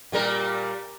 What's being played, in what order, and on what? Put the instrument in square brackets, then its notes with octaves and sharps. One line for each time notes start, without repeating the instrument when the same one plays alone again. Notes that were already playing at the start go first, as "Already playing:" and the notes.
[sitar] A#2 G3 A#4